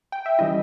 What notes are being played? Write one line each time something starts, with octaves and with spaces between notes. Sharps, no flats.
G5
E5
E3 G3 C#4 E4 D#5